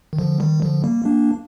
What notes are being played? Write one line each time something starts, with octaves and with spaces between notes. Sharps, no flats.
D#3
D3 F3
D#3 G3
D3 F3
G3 A#3
A#3 D4